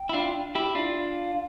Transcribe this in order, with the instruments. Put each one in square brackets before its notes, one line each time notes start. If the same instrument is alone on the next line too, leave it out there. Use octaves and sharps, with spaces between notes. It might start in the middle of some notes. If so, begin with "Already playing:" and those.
Already playing: [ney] G5
[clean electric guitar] E4
D4 F4
E4 G4
[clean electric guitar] D4 F4 [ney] F5